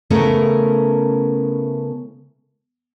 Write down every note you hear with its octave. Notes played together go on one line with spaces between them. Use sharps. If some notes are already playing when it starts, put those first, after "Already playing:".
C#3 A3 B3 C#4 E4 A#4